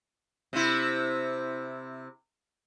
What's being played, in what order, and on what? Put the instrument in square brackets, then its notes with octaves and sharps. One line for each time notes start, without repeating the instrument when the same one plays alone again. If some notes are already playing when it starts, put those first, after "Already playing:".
[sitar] C3 C4 E4